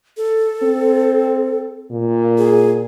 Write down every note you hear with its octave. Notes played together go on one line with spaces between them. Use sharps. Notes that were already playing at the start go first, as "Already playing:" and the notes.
A4
C4
A#2
G#4